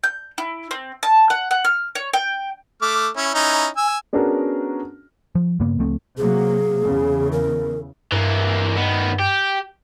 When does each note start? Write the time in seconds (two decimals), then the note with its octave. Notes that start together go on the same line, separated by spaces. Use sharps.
0.04 G6
0.38 E4
0.71 C4
1.03 A5
1.30 F#5
1.51 F#5
1.65 F6
1.95 C#5
2.13 G5
2.82 A3 D6 F6
3.16 C#4 E4
3.35 C#4 D#4 E4
3.77 G#5 E6
4.13 B3 C#4 D4 F#4 G#4 A#4
5.35 F3
5.60 G2 C#3 A#3 B3
5.79 C#2 F3 A3 C4
6.18 C3 F#3 A#3 G#4
6.82 E2 C#3
7.32 A#4
8.12 G2 E3 A#3
8.77 D#3 B3
9.20 G4